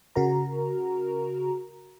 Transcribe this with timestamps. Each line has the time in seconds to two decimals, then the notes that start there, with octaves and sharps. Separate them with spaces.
0.16 C#3 F#4 A#4 A#5